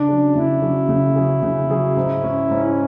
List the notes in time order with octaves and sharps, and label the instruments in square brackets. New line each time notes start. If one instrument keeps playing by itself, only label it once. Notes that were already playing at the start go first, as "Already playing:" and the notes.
Already playing: [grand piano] C#3 [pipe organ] D4
[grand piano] F#3 C#4 G#4
[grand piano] C#3 [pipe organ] E4
[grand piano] F#3 C#4 G#4
C#3
F#3 C#4 G#4
C#3
F#3 C#4 G#4
G#2
G#3 C#4
[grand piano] G#2 [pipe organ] C#4